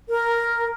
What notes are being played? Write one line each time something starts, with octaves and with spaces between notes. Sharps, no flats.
A#4